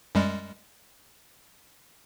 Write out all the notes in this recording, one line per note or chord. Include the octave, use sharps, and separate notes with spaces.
F#2 G3 G#3